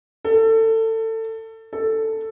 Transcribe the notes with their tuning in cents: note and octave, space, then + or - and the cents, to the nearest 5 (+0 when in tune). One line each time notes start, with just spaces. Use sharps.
A4 +25
A4 +10